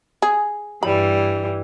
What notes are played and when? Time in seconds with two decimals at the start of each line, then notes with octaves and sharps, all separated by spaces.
0.22 G#4
0.83 G2 E3 G3 B5